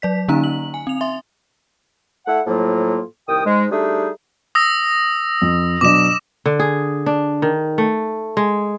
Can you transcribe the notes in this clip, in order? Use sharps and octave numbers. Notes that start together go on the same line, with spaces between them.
F#3 D5 B6
D3 A#3 C#4 D#4 A#5
F#7
G#5
C4 F7
E5 C6
A3 E4 F#5
A2 F3 F#3 A#3 F4
C2 D#3 G5 D#6
G#2 G#3
G3 A3 D4 D#4 G#4
D#6 E6 A#6
F2
B2 F#3 D4 D6 E7
D3
G#4
D4
D#3
A3
G#3